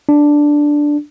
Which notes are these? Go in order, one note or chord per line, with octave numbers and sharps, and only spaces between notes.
D4